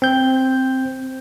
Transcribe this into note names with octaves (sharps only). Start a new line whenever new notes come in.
C4 G6